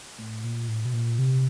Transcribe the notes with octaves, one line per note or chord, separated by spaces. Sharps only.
A2
A#2
A2
B2
A#2
C3